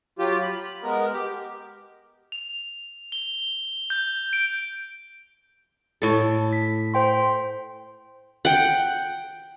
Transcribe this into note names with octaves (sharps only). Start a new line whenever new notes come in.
F#3 F4 G4
B5
G#3 B3 A#4
G4
F7
G7
G6
D7
A2 A4
B6
C5 G5 C6
F#5 G5